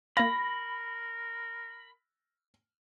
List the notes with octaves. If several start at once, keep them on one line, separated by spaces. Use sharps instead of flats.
A#3 A#4 F5 B5 A#6